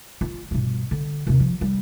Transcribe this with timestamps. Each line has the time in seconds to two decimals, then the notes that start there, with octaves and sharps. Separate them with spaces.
0.21 F4
0.51 G2 B2
0.91 D3
1.27 D#2 C3
1.40 F3
1.61 G3